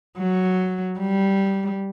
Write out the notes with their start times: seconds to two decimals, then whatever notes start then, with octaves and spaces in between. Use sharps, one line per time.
0.18 F#3
0.99 G3